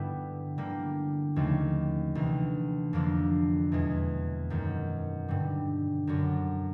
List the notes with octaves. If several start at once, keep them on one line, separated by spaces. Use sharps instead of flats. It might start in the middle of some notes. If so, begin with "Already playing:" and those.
Already playing: G2 D3 G3 B3 E4
D3 G3 A#3
D#2 C#3 F3 A3 C#4
D2 C3 E3
F2 D3 F3 A#3 D4
E2 B2 G#3
F#2 D#3 G#3
G2 D3 G3
F#2 D3 F#3